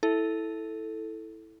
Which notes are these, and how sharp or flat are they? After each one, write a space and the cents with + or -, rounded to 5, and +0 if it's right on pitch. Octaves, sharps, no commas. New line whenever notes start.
E4 -10 A4 +0